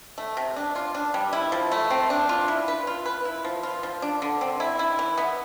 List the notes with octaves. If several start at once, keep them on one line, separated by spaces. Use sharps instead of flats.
A3
C3
D4
F4
D4
G3
E4
F3
A3
C4
D4
F4
E4
B4
F4
B4
E4
F3
F4
F3
D4
D3
C4
E4
E4
E3
B3